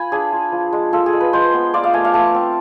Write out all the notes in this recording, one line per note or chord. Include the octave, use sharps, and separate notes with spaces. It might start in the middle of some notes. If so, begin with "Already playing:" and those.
Already playing: F4 G#5 B5
D4 G#4
F4
F3
G#3
F4 A4
G#4
G#3
B4
G#3 C5
B3
F4 D5
F5
A3 G#5
F5
A3 A5
C4